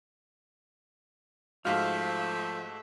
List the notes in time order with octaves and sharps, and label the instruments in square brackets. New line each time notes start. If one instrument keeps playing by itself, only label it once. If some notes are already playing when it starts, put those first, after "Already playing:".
[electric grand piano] G#2 F#4 [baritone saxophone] F3 [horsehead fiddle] A3 E5 [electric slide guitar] F5